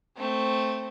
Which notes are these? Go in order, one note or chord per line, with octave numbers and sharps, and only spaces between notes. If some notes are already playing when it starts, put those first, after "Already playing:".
A3 C4